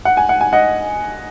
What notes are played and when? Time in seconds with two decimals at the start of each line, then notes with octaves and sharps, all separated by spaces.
0.05 F#5
0.17 G#5
0.29 F#5
0.41 G#5
0.53 D#5 F#5